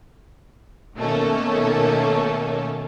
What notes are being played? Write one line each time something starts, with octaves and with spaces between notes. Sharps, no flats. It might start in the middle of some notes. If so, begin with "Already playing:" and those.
B2 D#3 A3 A#3 C#4 A4